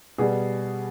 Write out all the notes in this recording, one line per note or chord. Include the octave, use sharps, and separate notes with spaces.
B2 G3 G#4